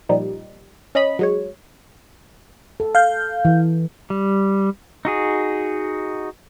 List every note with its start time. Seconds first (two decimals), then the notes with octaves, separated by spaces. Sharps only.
0.09 A#2 F3 G3 D#4
0.95 C#4 D#5 B5
1.19 F#3 G#3 C#5
2.80 A4
2.95 F5 G6
3.45 E3
4.10 G3
5.05 D#4 F#4 G#4